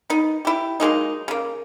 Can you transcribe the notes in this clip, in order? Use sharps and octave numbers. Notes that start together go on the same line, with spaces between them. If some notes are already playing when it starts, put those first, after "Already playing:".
B3 D#4
E4 G4
F#3 G#3 A#3 D#4
C#3 A#3